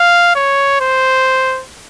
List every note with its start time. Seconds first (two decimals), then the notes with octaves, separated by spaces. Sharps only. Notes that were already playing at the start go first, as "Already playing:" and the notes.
Already playing: F5
0.35 C#5
0.81 C5